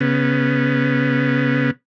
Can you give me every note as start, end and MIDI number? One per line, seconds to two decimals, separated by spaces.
0.01 1.71 49
0.01 1.71 59